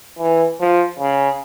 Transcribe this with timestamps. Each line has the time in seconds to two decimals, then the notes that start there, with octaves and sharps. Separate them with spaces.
0.19 E3
0.60 F3
0.99 C#3